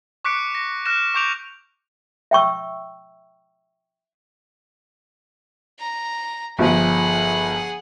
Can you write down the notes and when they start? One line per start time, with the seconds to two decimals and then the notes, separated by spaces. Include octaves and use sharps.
0.24 C#6 D6 F#6 B6 C#7 D7
0.55 A#6
0.86 F6 F#6 A#6 E7
1.14 C#6 D6 G6 D7 F7
2.31 E5 G5 C#6 E6
5.79 A#5
6.59 G1 F3 G#4 F#5